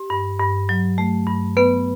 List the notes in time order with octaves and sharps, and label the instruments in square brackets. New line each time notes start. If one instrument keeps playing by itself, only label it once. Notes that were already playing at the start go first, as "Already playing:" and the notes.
Already playing: [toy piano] G4
[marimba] G2
G2
F#3
A3
G2
[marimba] B3 [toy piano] B4